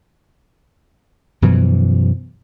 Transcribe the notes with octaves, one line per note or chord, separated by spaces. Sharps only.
F#2 B2 E3 F3